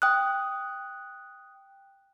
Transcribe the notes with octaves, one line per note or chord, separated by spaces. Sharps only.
G5 D#6 F#6